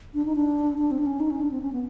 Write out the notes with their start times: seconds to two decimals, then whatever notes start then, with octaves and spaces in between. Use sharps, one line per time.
0.14 D4
0.25 D#4
0.35 D4
0.78 D4
0.91 C4
0.99 D4
1.06 C#4
1.20 D#4
1.30 C#4
1.41 D4
1.51 C4
1.62 C#4
1.72 B3